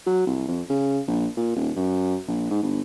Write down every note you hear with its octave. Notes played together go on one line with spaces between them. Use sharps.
F#3
C2
F2
C#3
A#1
A#2
D#1
F#2
A#1
G#2
G1